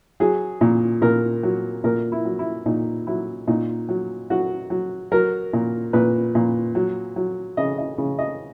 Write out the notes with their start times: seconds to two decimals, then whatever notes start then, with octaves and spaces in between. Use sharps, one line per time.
0.20 F#3 G#4
0.61 A#2
1.02 A#2 A#4
1.43 F#3
1.84 A#2 A#4
2.12 E4
2.25 F#3
2.39 E4
2.66 A#2 D#4
3.07 F#3 E4
3.47 A#2 D#4
3.89 F#3
4.30 F#3 F#4
4.70 F#3
5.12 F#3 A#4
5.53 A#2
5.93 A#2 B4
6.35 A#2
6.75 F#3
7.16 F#3
7.57 C#3 D#5
7.78 D#5
7.98 C#3
8.19 D#5